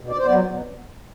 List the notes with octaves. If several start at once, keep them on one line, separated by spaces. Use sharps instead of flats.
B2
D5
C5
F#3 B3 D5
B2